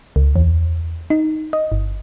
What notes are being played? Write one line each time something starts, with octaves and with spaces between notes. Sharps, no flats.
C#2
E2
D#4
D#5
G1